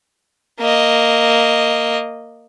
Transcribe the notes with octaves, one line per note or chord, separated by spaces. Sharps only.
A#3 D#5